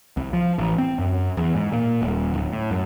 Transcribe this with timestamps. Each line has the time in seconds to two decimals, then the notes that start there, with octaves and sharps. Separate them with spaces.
0.17 C2
0.33 F3
0.58 A1
0.78 C4
0.99 F#2
1.37 E2
1.55 G#2
1.72 A#2
2.02 D#1
2.34 D1
2.53 A2
2.71 F#2